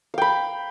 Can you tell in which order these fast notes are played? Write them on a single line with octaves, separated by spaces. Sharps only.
F5 G5 B5